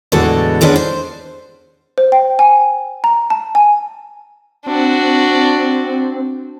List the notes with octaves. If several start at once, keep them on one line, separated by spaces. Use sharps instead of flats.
E2 A2 D3 G#3 F#4 A4
E3 G#3 B3 C#4 D4
C5
C5
G5
G#5
A#5
A5
G#5
C4 D4 F#4